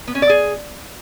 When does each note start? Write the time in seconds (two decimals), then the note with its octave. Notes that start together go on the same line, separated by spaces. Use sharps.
0.08 B3
0.15 C#4
0.22 D5
0.30 G#4